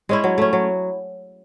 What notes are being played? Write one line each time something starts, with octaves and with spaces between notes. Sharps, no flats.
G#3 C#4 E4
F#3
A3 C#4
F#3